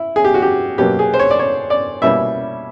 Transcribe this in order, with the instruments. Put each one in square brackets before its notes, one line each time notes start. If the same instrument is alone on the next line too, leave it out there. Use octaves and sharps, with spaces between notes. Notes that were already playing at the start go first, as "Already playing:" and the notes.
Already playing: [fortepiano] E4
G#4
G4
F#4
G4
B2 F#3 A#3 G4
G#4
C5
C#5
D5
C#5
D5
B2 G3 A#3 C#4 E4 E5